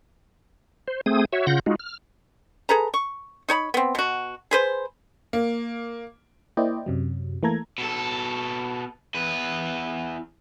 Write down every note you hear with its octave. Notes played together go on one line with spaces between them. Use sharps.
C5
A3 C4 G#4 D#6
F#4 C#5 E5
C#3 F4 F#5 G6 A#6
G#3 D#4 F4 F#4
F6
G#4 A4 B4 A#5
C#6
D#4 C#5 A#5 B5
B3 C4
B2 F#4
G#4 B4 C5
A#3
A#3 E4 C5 D5 D#5 G5
F#2 C3 F#3
E3 A3 A#3 A4 A#5 G#6
B2 A4
E2 B4